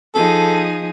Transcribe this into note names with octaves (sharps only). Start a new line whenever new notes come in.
F3 D#4 G#4 A4